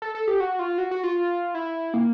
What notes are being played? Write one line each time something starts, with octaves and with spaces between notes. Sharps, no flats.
A4
A4
G4
F#4
F4
F#4
F#4
F4
E4
A#3